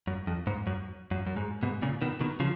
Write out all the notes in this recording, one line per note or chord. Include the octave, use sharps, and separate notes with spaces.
F#2
F2
G#2
F#2
F#2
F#2
G#2
G#2 B2
A#2 C#3
B2 D#3
B2 D#3
C#3 F3